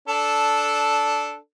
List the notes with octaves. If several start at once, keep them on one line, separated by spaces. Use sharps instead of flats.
D4 A4